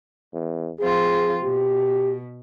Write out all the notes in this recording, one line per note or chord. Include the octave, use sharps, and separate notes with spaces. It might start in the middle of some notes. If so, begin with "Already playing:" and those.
E2
F3 C4 F4 G#4
B2 G4